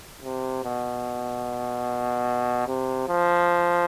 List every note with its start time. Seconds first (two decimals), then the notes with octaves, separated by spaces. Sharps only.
0.23 C3
0.64 B2
2.67 C3
3.08 F3